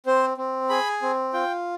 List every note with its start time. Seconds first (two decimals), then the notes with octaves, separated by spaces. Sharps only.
0.06 C4 C5
0.37 C4
0.69 G#4 B5
1.02 C4
1.33 F4 G5